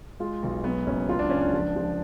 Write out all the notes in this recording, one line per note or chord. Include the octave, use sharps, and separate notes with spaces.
G#3 F4
B1
F#3 B3
F#1 C#4
C#2 F4
D4
C#2 C#4
D4
F3
F3